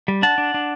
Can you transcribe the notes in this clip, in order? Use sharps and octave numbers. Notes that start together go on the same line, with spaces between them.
G3
D4 F#5 A5
D4
D4